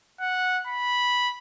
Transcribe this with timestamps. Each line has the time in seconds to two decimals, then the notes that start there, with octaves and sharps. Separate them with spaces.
0.21 F#5
0.67 B5